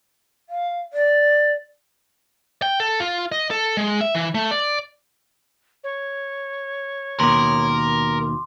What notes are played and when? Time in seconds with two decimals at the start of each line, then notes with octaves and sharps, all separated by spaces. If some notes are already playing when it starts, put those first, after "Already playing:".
0.49 F5
0.93 D5
2.62 G5
2.80 A4
3.00 F4
3.32 D#5
3.50 A4
3.77 G#3
4.01 E5
4.15 E3
4.35 A3
4.51 D5
5.84 C#5
7.20 D#2 B2 A#4 C6 D6